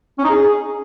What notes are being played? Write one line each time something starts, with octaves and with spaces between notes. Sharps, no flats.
C#4
D#4
G#4